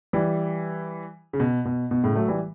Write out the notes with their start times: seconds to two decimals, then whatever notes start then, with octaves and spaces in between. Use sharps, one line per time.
0.13 E3 G3
1.33 C#3
1.40 B2
1.65 B2
1.91 B2
2.03 A2 C#3
2.16 F#3 A3
2.28 E3 G3